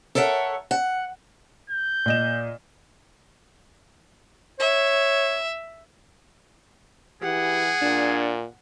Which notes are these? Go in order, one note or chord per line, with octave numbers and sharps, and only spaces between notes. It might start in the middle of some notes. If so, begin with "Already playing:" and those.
A4 A#4 C#5 E5 F#5
F#5
G6
A#2 D#5 E7
C#5 E5
E3 G4 G#4 F#5
A#2 D4